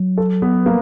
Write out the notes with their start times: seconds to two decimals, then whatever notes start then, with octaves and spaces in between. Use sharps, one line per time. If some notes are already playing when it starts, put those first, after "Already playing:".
Already playing: F#3
0.18 A4
0.42 B3 B4
0.66 A#3 A#4